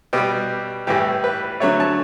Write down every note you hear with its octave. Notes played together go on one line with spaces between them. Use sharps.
B2 G3 G4
A2 E3 G3 G4
B4
D3 F#3 A3 C#5
A5